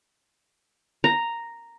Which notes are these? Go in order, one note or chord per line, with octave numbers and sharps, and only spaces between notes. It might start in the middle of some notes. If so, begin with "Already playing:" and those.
A#5